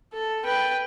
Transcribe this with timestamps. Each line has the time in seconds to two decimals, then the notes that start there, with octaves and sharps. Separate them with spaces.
0.13 A4
0.45 B4 G5